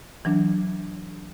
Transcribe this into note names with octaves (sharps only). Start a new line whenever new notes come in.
E3 F#3 D4